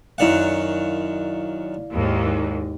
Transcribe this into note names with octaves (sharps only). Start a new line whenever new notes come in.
F#2 D#3 E4 D5 F5 F#5
D#2 G#2